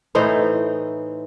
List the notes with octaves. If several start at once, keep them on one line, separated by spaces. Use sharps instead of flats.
A2 E3 D#4 C5